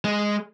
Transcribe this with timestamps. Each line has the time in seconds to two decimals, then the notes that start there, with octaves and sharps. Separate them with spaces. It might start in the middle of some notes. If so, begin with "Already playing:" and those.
0.04 G#3